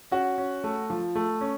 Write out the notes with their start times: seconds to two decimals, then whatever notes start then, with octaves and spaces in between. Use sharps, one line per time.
0.11 C#4 F#4
0.38 C#4
0.64 A3
0.90 F3
1.15 A3
1.41 C#4